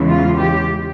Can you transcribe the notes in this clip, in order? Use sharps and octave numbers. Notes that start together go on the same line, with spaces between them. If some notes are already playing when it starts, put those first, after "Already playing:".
Already playing: E2 C#3 E3 G#3
F4
G4